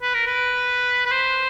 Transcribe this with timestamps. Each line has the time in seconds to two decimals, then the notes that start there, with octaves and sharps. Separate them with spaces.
0.02 B4
0.14 A#4
0.27 B4
1.06 B4
1.12 C5